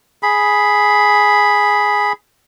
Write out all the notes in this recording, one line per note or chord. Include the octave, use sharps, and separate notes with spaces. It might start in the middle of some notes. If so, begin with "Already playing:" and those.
G#4 B5